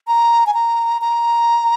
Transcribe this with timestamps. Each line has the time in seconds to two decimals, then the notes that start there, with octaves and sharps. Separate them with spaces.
0.08 A#5
0.47 G#5
0.54 A#5
1.02 A#5